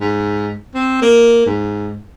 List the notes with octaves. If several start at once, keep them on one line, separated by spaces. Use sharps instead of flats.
G#2
C4
A#3
G#2